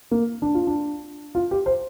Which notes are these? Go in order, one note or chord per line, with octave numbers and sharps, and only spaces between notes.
A#3
D4
F4
D4
F4
G4
C5